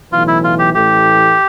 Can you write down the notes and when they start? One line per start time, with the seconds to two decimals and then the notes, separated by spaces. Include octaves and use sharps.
0.12 B1 A2 E3 F4
0.28 E4
0.44 F4
0.59 G4
0.74 A1 A2 E3 A3 G4